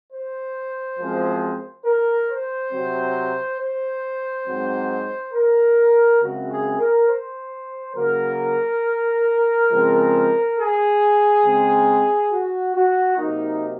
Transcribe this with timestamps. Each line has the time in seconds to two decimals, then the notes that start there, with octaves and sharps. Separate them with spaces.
0.11 C5
0.98 F#2 F3 G#3 C4
1.85 A#4
2.28 C5
2.72 C3 F#3 C4
3.59 C5
4.47 G#2 F#3 C4
5.34 A#4
6.21 F#2 C#3 G#3 C4 F#4
6.50 G#4
6.79 A#4
7.08 C5
7.95 C#3 F#3 A#3 A#4
9.70 C#3 F3 G#3 C4
10.56 G#4
11.44 C#3 G#3 C4
12.32 F#4
12.75 F#4
13.18 C3 F#3 A#3 D#4